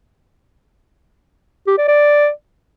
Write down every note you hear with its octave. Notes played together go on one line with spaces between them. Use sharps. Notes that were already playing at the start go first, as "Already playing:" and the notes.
G4
D5
D5